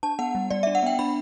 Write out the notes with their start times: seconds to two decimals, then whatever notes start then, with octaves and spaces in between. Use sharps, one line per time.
0.03 D4 A5
0.19 B3 F#5
0.35 G3
0.50 G3 D5
0.63 E5
0.67 D4
0.75 F#5
0.83 B3 G5
0.99 D4 B5